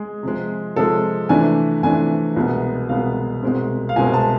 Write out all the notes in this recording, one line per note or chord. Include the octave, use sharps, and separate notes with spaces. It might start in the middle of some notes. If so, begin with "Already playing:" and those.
Already playing: G#3 G#4
C3 F3 G#3
C3 F3 G#3 A4
C3 E3 A3 D4 G#5
C3 E3 A3 D4 G#5
C2 B2 G#3 B3
C2 B2 G#3 B3 F5
C2 B2 G#3 C4
F5
C2 B2 G#3 C4 G#5
A5